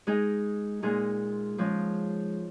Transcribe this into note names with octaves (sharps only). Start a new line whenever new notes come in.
G#3 D#4 G#4
A#2 G#3 D#4 G#4
F3 G#3 C#4